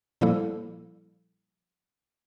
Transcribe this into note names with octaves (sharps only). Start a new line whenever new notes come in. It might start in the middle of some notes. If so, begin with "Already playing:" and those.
A#2 F3 G3 A#3 E4 A4